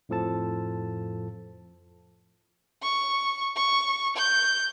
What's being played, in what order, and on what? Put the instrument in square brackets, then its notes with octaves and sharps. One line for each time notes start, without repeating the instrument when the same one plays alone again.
[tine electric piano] F2 A2 F3 A4 A5
[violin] C#6
C#6
G6